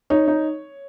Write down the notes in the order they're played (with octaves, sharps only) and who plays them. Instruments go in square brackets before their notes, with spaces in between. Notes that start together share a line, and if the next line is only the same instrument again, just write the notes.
[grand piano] D#4 [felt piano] C#5
[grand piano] D#4